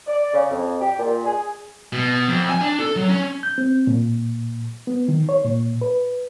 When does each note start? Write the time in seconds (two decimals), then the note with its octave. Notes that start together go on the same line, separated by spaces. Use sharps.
0.07 D5
0.34 C#3
0.51 F2
0.81 G4
0.99 A#2
1.25 G#4
1.93 B2
2.28 F2
2.49 G#5
2.61 D4
2.80 A4
2.96 F#3
3.09 C#4
3.43 G6
3.58 C4
3.87 A#2
4.87 B3
5.08 D#3
5.29 C#5
5.45 A#2
5.81 B4